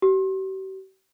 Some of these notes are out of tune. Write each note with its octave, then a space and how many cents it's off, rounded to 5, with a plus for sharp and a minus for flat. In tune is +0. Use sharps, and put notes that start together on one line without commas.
G4 -45